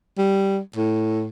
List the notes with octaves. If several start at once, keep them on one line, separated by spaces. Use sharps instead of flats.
G3
A2